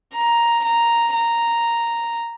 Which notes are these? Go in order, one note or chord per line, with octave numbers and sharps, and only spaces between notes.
A#5
A#5
A#5